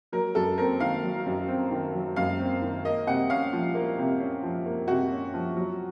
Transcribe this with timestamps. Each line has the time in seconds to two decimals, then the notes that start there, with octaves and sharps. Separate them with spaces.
0.12 F#3 A#4
0.35 F#2 A4
0.58 C4 A#4
0.80 D#3 F5
1.03 F#3
1.26 F#2
1.48 C4
1.71 D#3
1.94 F#3
2.16 F#2 F5
2.39 C4
2.62 D#3
2.85 A#3 D#5
3.07 C3 F#5
3.30 C#4 F5
3.53 F3
3.74 A#3
3.98 C3
4.20 C#4
4.43 F3
4.66 A#3
4.88 C3 F#4
5.11 C#4
5.34 F3
5.57 F#3